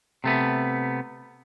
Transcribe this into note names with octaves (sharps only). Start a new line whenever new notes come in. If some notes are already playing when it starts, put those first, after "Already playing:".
C3 A3 B3